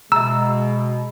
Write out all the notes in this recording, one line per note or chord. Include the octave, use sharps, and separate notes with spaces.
B2 G#3 E5 A#5 E6